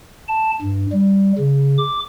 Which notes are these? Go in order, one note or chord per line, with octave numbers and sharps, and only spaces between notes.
A5
G2
G3
C#3
D6